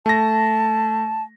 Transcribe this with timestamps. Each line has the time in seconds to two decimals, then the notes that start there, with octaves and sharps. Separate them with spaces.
0.06 A3 A5 A#6